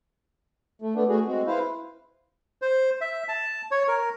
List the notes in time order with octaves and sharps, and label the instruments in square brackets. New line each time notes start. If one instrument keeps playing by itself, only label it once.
[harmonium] A3
A3 B3 D4
A3 F#4 G#4
G#3 C4 F#4
E4 B4 C5 F5
[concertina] C5
E5
A5
C#5
A#4